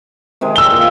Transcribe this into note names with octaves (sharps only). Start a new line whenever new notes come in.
C3 D#3 G#3
E6 G7
A#2